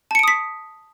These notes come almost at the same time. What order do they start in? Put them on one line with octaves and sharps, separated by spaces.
A5 C#7 D7 D#6 B6